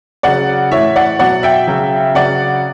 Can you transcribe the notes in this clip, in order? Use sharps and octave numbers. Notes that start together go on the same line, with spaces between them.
C#3 F#3 D5 F#5
A2 E3 C#5 E5
D5 F#5
B2 F#3 D5 F#5
E5 G5
C#3 F#3
C#3 F#3 D5 F#5